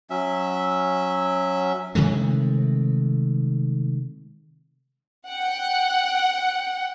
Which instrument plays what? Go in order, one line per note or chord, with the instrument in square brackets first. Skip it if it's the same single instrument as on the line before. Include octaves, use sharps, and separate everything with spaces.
[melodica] F#3 C#4 E5
[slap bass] C3 D#3 G#3 A3
[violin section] F#5 G5